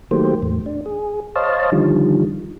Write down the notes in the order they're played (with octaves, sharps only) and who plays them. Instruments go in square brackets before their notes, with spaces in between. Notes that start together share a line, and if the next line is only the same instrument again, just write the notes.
[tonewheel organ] D#3 F#3 A3 A#3 G4 C5
E2 A2
D4
G#4
C5 C#5 D#5 F5 A5
D3 D#3 F3 G3